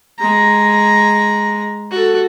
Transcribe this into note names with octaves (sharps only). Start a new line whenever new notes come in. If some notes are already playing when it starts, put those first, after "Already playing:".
G#3 A#5
F#4 A4